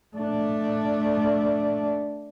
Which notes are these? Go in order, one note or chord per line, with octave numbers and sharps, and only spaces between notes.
A3 D4